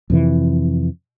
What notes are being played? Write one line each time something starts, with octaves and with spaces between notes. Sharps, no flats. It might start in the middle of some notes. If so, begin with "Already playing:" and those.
F2 C3 E3